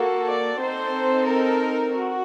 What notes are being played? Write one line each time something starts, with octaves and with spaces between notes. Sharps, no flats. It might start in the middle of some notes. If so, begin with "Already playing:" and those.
Already playing: A#3 F#4 A4
D5
C4 D#4 A4 C5
A#4
F#4